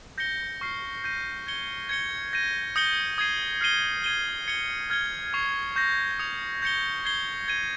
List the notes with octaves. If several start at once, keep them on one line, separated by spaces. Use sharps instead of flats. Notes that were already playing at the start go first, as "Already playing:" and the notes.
G6 A#6 C#7 G7
C#6 F6 C7
G6 A#6 D#7
G#6 C#7 G7
G#6 C#7 G7
G6 A#6 D#7
D#6 G6 A#6 C#7 G7
D#6 G#6 C7 D#7
F6 C7 D#7 G7
G#6 D#7 G7
G#6 C#7 G7
F6 G#6 C#7 G7
C#6 F6 C7 F7
C#6 G6 A#6
D#6 G#6 C#7 F7
G6 A#6 C#7 G7
G#6 C7 G7
G#6 D#7 G7